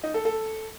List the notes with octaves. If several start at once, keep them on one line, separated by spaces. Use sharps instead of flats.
D#4
A4
A4